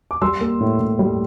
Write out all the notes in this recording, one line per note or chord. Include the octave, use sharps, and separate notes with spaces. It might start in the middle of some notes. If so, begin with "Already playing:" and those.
D6
G3 C6 E6
A#3
A2
A2
G3